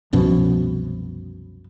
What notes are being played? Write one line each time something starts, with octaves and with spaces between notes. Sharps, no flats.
C2 F#2 B2 F3